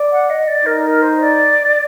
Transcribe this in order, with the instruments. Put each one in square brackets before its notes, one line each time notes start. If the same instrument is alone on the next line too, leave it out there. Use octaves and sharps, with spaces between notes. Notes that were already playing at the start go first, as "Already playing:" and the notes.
Already playing: [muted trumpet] D5
[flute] F#5
D#5
D5
[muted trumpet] D#4 [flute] A#4
[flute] A#4
C5
D5